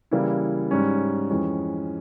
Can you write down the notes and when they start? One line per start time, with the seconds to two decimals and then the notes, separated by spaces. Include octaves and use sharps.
0.11 C#3 E3 G3 A#3 E4
0.71 G#2 G3 C#4
1.30 F2 E3 G#3 C#4